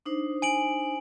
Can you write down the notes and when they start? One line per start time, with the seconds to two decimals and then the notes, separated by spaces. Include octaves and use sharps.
0.06 D4 D#4 C5
0.42 G#5 D7 F#7